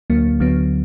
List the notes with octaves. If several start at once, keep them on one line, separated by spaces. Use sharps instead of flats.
D2 D3 F#3 A#3
D2 D3 F#3 B3